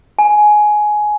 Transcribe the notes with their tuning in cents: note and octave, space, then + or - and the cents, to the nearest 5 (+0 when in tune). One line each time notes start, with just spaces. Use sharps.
G#5 +15